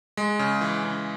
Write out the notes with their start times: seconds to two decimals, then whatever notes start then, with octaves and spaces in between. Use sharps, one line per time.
0.17 G#3
0.39 C#3
0.61 E3
0.84 C#3